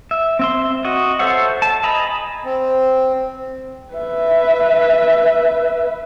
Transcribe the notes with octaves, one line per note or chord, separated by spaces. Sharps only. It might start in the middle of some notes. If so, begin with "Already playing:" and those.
E5
C4 E5 C6
F#4 D#5
A4 C5 C#5 E5 F#5
A5
D#5 G#5 A#5 B5
C4
B4 E5